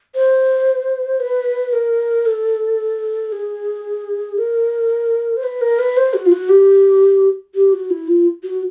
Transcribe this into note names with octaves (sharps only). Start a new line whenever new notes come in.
C5
B4
A#4
A4
G#4
A#4
C5
B4
A#4
B4
C5
F#4
F4
F#4
G4
G4
F#4
E4
F4
F#4